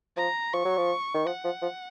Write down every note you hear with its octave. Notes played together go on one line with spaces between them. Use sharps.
F3 A#5
F3 C#6
F#3
F3
D#3
F3 F#5
F3
F3